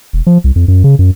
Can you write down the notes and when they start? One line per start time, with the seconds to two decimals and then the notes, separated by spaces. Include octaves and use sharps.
0.13 E1
0.27 F3
0.44 C2
0.56 F2
0.68 F#2
0.84 C#3
0.99 F#2